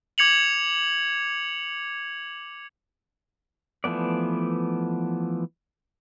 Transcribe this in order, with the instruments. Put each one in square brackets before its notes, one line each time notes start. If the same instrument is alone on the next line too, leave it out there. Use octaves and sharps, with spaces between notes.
[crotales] D6 G#6 C#7 F7 F#7
[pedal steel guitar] E3 F3 A3 B3 D5